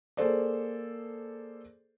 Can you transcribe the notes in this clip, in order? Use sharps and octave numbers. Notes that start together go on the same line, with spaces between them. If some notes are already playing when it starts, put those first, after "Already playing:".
A#3 G#4 A4 C5 D5